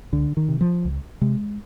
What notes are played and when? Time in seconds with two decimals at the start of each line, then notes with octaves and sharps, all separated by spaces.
0.12 C#2 D3
0.37 D#3
0.49 C3
0.61 F3
0.85 C#2
1.21 C3 G#3